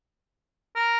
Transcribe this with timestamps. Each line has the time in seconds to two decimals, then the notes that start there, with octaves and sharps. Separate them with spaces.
0.76 A#4